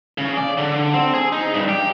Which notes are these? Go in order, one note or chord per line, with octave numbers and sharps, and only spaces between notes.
C#3
D5
D3
C4
G#4
D#4
G2
G4